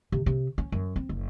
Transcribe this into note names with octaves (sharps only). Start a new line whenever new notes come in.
C3
C3
C#4
F#2
C4
F#1